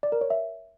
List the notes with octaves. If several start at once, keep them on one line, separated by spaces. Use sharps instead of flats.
D5
A#4
C#5
E5